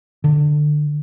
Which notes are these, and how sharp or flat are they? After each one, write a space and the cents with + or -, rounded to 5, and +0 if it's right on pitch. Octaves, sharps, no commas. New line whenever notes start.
D3 +25